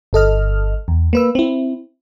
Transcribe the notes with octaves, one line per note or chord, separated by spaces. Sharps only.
G1 A4 D#5 F6
E2
A#3 B4 E6
C4 E4